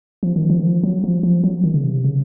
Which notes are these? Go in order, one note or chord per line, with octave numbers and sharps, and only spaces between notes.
F3
D#3
F3
D#3
F3
F#3
F3
F3
F#3
D#3
C#3
C3
C#3